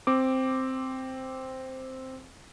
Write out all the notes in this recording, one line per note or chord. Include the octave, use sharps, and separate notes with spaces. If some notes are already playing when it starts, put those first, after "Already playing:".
C4 D6